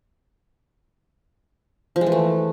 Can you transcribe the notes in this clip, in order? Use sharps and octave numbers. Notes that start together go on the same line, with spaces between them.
F3
G#3
E3
A3